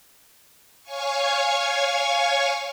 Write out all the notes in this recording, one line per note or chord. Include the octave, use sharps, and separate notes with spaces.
C#5 F5 G#5 C#6